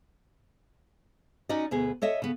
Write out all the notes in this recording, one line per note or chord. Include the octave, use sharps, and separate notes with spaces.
C#4 D#4 F#4 D5 D#5
D2 B2 B3 G#4
A4 C#5 D#5 E5
C#3 B3